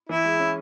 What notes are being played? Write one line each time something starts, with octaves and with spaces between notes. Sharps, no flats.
E3 E4
G#3
C#4